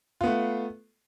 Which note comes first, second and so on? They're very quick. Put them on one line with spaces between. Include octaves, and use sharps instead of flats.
F4 B3 A3